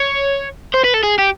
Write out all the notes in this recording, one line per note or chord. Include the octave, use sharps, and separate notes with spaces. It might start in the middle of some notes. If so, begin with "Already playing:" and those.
Already playing: C#5
C5
B4
A4
G#4
G4